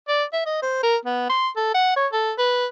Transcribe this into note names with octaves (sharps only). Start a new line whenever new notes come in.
D5
E5
D#5
C5
A#4
B3
C6
A4
F#5
C#5
A4
B4